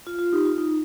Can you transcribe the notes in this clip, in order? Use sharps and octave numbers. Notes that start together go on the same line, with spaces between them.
F4
F4
D#4 G4
F4
D#4